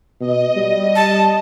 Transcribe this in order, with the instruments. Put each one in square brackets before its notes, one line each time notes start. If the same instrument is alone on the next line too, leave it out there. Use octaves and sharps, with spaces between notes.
[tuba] B2 [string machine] D#5
[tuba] G3
[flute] A5